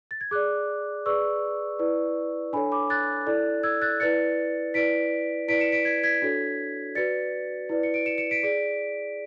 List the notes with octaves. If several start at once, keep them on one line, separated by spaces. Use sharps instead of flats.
A6
G#6
G#4 D5 D6 F#6
G#4 B4 D5 C#6 E6
E4 B4 D5
D4 A4 C#5 G#5 B5
B5 D6
F#6 A6
E4 A4 D5
E6 G#6
F#6 A6
E4 B4 D5 A6 C#7
E4 B4 D5 B6 D7
E4 B4 D5 B6 D7
C#7 E7
B6 D7
G#6 B6
G#6 B6
D4 F#4 A4 C#5
F#4 B4 D5 A6 C#7
E4 B4 D5
C#7
D7
C#7 E7
C#7 E7
B6 D7
G#4 D5